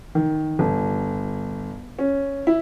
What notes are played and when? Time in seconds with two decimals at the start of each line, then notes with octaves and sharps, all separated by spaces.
0.15 D#3
0.59 G1
1.99 C#4
2.47 E4